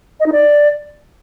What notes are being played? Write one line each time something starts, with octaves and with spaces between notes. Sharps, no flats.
D#5
D#4
D5